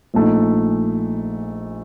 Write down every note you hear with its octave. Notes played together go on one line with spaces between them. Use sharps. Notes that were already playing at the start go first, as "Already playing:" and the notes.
A#1 A#2 A3 D#4